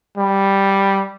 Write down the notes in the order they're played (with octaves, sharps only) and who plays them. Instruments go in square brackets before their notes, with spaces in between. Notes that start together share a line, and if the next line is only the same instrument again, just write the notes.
[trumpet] G3